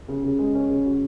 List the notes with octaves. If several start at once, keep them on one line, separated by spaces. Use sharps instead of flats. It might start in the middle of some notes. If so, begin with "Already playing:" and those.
C#3
C#3
G#3
C#4
C#3
F#4